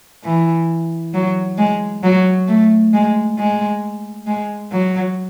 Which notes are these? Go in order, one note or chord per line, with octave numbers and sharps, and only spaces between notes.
E3
F#3
G#3
F#3
A3
G#3
G#3
G#3
F#3